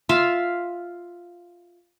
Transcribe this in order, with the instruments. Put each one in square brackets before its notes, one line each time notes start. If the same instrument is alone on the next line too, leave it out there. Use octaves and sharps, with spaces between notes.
[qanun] F4 E5 F5